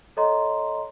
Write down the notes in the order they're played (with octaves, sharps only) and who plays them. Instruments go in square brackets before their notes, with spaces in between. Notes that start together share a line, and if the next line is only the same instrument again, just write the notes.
[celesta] A4 C#5 D#5 A#5 C6